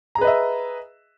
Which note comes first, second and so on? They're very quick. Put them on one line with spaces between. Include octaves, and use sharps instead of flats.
A#5 G#4 B4 D#5 E5